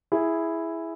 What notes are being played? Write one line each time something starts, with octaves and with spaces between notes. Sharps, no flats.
E4 G#4